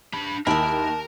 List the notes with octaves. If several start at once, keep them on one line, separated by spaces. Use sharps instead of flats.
D4 B5
D#2 G#3 E4 A#4 A5